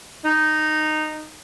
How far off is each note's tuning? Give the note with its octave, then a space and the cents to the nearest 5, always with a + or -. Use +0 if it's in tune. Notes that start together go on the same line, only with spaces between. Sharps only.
D#4 -10